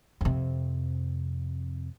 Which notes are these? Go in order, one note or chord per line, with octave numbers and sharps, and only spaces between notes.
F2 C3